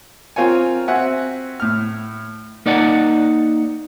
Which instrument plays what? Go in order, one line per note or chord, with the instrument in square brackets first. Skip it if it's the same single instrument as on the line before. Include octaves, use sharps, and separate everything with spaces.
[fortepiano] C4 F4 A#4 C#5 G#5
C4 F#4 E5 F#5 G#5
A2 F6
[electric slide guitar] A#3 D#4 D5 F#5